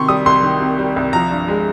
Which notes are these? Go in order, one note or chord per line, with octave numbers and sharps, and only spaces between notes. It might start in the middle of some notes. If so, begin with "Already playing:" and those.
Already playing: C3 D#3 C6 C#6
G3 D#6
C2 C6
D#3
C3
G3
C2
F3 A#5
G2
G#3